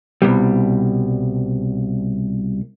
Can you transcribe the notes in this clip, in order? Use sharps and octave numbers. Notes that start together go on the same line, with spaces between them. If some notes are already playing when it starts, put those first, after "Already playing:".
C2 B2 G3